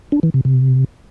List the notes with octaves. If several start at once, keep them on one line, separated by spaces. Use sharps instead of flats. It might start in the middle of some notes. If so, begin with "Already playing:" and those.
D4
E3
C3
C3